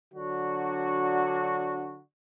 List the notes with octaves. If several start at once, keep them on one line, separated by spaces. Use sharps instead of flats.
D3 F#3 D4 F#4